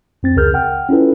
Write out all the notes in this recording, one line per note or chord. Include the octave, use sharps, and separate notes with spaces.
F2 C4 A6
C#2 C#3 G#4 A#4 F6 G6
F#5 G5 F6
C#4 E4 F4 A4 B4